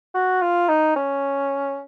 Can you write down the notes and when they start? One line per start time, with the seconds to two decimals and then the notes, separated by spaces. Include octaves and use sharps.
0.15 F#4
0.42 F4
0.69 D#4
0.96 C#4